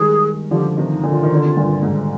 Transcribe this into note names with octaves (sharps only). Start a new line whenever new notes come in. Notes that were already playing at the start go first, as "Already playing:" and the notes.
Already playing: D#3 G3 G#3 G#4
D3 F3 G4
C3 D#3
D#4
A#2 D3
F4
D#3
D3
C3
G2 A#2
G#2